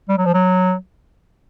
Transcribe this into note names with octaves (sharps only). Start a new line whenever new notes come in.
G3
F#3
F3
F#3